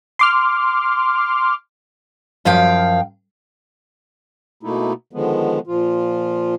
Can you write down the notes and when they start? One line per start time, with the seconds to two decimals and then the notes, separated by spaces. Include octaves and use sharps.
0.19 C6 D6 F6
2.45 F#2 F3 F5 G5
4.63 B2 A3 A#3 D#4 E4
5.13 D3 D#3 F3 G#3 B3
5.67 A#2 F3 F4